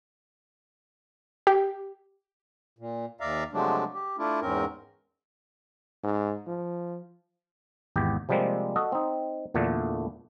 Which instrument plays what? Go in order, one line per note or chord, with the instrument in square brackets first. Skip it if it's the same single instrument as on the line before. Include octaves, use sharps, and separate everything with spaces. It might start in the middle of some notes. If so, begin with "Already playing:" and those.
[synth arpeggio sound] G4
[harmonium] A#2
D#2 D5 E5 F5 A#5
C3 F3 F#3 G#3 A3 D4
G4
A3 D4 E4 F4
E2 G#2 C4 C#4 A#4
[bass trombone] G#2
F3
[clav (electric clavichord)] G#1 E2 G4
C3 F3 G3 G#3 A#3 C4
F#4 A4 D#5
C4 D#4
E2 A#2 D3 A3 D4